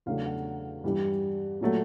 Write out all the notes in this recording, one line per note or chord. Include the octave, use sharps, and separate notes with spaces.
E2 C#3 F#3 A3 D4 F5
F#5
G2 E3 G3
A#2 F#3 A3